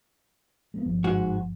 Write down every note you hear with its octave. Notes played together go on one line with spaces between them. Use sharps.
G#3 A3 B3
G1 G2 F3
G#2 F#4